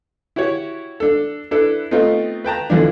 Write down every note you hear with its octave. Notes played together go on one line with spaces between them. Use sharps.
E4 F#4 G4 C#5
D4 A4
D4 E4 A4 B4
A3 B3 C4 D#4 F4
B4 G5 A5 A#5
B2 D3 E3 F3 D4